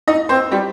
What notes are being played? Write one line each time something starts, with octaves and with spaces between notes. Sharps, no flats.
D#4 D#5
C4 C5
G3 G4